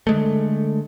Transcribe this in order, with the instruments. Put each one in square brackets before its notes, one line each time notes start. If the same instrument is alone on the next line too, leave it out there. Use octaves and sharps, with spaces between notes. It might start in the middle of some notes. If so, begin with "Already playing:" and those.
[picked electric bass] D3 G#3 A3